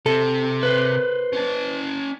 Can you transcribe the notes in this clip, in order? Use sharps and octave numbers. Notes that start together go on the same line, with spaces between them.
C3 A4
B4 C5
C#4 A5